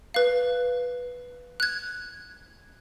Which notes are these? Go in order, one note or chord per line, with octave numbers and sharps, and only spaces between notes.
B4 F5
F#6 G#6